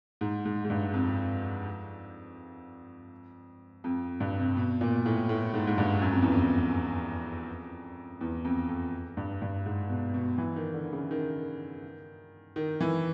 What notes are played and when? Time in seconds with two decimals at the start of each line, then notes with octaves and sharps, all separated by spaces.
0.21 G#2
0.45 G#2
0.65 G#2
0.70 G2
0.94 F2
3.84 F2
4.20 G2
4.39 C3
4.57 B2
4.81 A#2
5.06 A2
5.29 A2
5.54 G#2
5.67 G#2
5.78 G2
6.02 F#2
6.12 F2
6.22 E2
6.32 F2
8.21 E2
8.45 F2
8.69 F2
9.17 G2
9.42 G2
9.66 G#2
9.90 B2
10.14 B2
10.38 E3
10.56 D#3
10.74 D3
10.93 C#3
11.11 D#3
12.56 D#3
12.80 E3